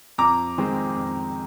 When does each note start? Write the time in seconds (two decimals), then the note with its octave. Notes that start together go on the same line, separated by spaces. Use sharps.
0.18 F2 A#5 D6
0.58 D#3 G#3 C4
0.97 F2